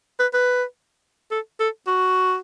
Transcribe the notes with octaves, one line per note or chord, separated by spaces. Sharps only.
B4
B4
A4
A4
F#4